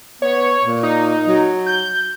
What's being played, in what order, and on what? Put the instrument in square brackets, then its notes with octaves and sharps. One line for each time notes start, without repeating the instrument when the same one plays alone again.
[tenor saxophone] B3 [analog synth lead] C#5
[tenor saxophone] A#2
[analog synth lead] D#4
[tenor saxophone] F#3
[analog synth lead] G6